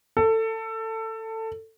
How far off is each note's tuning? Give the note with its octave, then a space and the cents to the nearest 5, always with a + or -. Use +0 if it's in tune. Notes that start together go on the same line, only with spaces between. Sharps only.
A4 +20